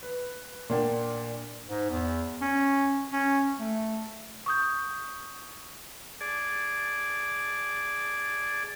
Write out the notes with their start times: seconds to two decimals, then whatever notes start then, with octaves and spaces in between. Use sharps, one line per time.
0.03 B4
0.69 A#2 A#3 D4 F#5 G5
1.68 G#2
1.91 E2
2.42 C#4
3.12 C#4
3.59 A3
4.46 C#6 D#6 G6
6.21 G#4 D5 A5